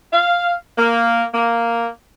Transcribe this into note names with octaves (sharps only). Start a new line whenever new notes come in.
F5
A#3
A#3